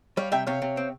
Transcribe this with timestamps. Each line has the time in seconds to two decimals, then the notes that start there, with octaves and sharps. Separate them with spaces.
0.17 G3 C#5 F5
0.32 C3 E5 G5
0.47 C3 C#5 F5
0.62 C3
0.77 C4